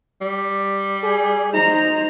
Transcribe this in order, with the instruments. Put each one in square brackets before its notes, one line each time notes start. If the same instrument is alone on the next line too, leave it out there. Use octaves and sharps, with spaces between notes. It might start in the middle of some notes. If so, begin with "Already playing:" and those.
[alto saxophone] G3
[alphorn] G#4
[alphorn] D#4 [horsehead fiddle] C5 A#5